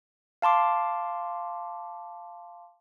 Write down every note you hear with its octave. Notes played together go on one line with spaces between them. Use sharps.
F5 A5 C6 D6